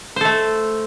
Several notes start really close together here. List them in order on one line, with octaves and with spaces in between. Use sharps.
C5 A4 A3